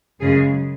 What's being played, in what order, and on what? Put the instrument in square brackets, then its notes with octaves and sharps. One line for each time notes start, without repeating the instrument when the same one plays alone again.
[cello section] F#2 C#3 G#3 G#4